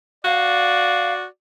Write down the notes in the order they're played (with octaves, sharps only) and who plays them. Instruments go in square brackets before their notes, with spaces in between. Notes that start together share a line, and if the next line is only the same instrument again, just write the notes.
[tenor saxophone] F#4 [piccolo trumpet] D5 [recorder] F5